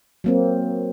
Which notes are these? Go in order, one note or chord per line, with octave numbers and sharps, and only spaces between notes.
F#3 A#3 C4